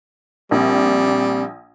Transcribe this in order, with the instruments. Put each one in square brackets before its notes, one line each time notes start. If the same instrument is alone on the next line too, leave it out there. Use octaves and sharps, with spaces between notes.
[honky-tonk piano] A#1 [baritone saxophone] G3 [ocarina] C4